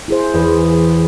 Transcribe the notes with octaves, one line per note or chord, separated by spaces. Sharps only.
E4 G#4 C5
E2